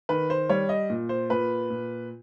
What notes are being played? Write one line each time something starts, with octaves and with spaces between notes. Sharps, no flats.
D#3 B4
C5
G3 C#5
D#5
A#2
C5
A#2 B4
A#2